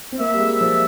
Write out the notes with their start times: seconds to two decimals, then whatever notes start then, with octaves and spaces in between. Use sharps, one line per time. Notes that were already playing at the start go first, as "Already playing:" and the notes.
0.12 C4
0.20 A#3 E5
0.34 G3
0.40 G#3
0.61 F3